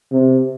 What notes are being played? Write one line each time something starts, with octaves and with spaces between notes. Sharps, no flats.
C3